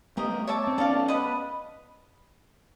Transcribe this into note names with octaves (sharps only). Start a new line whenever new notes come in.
A3 B3 G4 A#4 D#5
C#5 E5 A5 D6
C4
B3 C#4 A4 D5 F5 A5
B4 D#5 F#5 B5